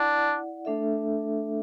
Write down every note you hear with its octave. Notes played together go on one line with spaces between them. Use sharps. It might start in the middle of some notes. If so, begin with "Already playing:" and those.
Already playing: D4 E4 D5 F#5
A3 D4 A4 E5